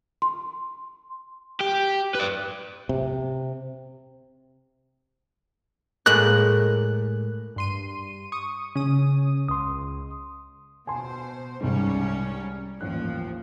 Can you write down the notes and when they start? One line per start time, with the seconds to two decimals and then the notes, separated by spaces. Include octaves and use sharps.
0.22 C6
1.61 G4
2.15 B4 D5
2.89 C3
6.06 A2 G#3 A#3 F#6
7.56 G2 C6 D#7
8.32 C#6 D#6
8.75 C#3 C#4 D#6
9.48 C#2 C6 D#6
10.87 B2 C5 G#5 A5 C6
11.60 C2 G#2 G3 C#4
12.81 A1 D#2 F3 F#6